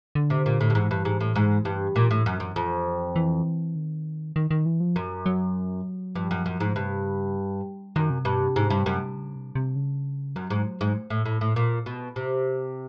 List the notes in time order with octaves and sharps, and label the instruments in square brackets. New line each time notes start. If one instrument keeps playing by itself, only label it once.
[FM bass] D3
[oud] C3
A#2
A2
G2
[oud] G#2 [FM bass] E3
[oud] G2
G#2
A2
G#2
G2
A#2
A2
F#2
F#2
F2
[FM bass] E3
D#3
D#3
D#3
E3
F3
[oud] F#2
[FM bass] F#3
[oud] G2 [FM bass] F3
[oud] F#2
F#2
G#2
[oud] G2 [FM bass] C3
[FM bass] C#3
[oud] F#2 [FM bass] D#3
[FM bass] C3
[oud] G2 [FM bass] B2
[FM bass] C3
[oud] G#2
G2
F#2
[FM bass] C#3
C3
C3
C#3
[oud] F#2 [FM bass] F#3
[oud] G#2
G#2
A2
A2
A2
A#2
B2
C3